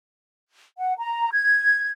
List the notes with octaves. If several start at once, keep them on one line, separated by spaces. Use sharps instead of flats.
F#5
A#5
G#6